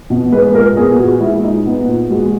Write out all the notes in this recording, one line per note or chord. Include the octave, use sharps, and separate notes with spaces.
B2
G#3 B4
A#2 A#4
B3 G#4
A#2 F#4
G#3 E4
A#2 D#4
B3
A#2
G#3 F#4